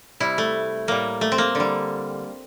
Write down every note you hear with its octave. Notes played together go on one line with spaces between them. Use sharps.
C3 G3 E4
A3
A2 G3 A#3
A3
C4
A#3
D3 G3